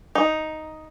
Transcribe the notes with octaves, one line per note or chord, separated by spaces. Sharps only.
D#4